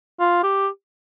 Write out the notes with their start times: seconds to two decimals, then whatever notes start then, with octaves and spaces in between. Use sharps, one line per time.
0.20 F4
0.43 G4